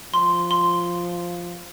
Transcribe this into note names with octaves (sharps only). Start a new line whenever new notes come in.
F3 C6
C6